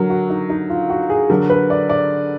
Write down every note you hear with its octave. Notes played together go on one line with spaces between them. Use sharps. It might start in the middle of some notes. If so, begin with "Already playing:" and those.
Already playing: D3 F#3 A#4
F#4
D#4
D#4
F4
F#4
G#4
D3 F#3 A#4
B4
D5
D5